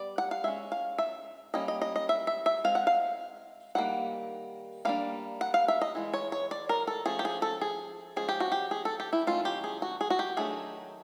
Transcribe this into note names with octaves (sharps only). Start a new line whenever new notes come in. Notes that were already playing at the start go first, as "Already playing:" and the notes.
Already playing: G3 B3 D5
F#5
F5
G#3 C#4 E5
F5
E5
G3 A#3 C#4 D#5
D#5
D#5
D#5
E5
E5
E5
G#3 C4 F5
F#5
F5
D#3 G3 A#3 F#5
G3 A#3 D4 F5
F#5
F5
E5
D#5
E3 G#3
C#5
C#5
D5
A#4
A4
F3 A3 C#4 G#4
G4
G#4
A4
G#4
F3 G#3 C#4 G#4
G4
F#4
G4
G#4
A4
G4
E4
D#3 F#3 A3 C#4 F4
G4
G#4
F#4
G#4
F#4
G4
D#3 F#3 A3 D4 G#4